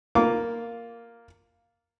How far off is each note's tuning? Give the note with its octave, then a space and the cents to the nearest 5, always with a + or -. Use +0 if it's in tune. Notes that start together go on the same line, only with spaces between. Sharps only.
A#3 +0 F4 +0 D6 -20